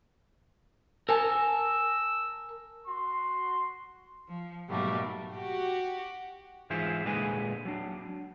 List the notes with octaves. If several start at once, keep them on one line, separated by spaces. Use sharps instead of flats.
A#4 G#5 A5 E6
F#4 C6
F3
G#2 B2 F#3 G3 A3 A#3
F#4 G4
G#2 E3 F4 G#4 C5 E5
A#2 D3 G#3 G#4 B4 G#5
F#3 D4